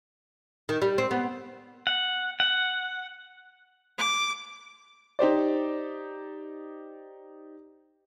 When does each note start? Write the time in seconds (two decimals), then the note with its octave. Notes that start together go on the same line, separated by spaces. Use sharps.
0.69 D#3
0.82 G3
0.98 C4
1.11 B3
1.87 F#5
2.40 F#5
3.98 D6
5.19 D#4 G4 C5 D5